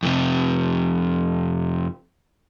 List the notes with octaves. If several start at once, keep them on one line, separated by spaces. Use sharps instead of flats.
F2 C3